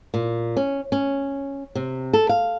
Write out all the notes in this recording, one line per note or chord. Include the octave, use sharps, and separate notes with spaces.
A#2
C#4
C#4
C3
A4
F5